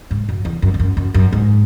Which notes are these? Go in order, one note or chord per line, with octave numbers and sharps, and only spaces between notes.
G#2
F#2
E2
F#2
G#2
F#2
F#2
F#2
G#2